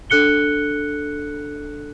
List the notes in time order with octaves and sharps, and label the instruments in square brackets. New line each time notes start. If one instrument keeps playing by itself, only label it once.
[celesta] D4 A4 F#6 C#7 G7